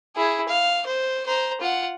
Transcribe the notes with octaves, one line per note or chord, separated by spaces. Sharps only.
E4 G#4
F5
C5
C5 A#5
F4 F#5